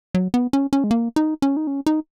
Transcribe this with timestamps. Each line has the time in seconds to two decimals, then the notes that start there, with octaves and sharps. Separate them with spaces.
0.15 F#3
0.34 B3
0.53 C#4
0.73 C#4
0.84 G#3
0.91 A#3
1.16 D#4
1.42 C#4
1.57 D#4
1.67 C#4
1.86 D#4